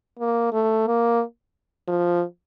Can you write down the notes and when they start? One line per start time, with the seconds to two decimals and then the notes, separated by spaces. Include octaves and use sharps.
0.19 A#3
0.52 A3
0.87 A#3
1.88 F3